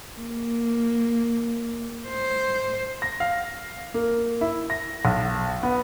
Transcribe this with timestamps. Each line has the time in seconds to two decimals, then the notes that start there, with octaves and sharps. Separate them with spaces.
0.20 A#3
2.08 C5
3.02 A#6
3.20 F5
3.94 A#3
4.41 E4
4.70 A#6
5.05 B1
5.63 B3